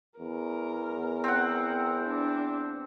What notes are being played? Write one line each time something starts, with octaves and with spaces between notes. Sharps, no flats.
E2 A#4
C4 F#5
D4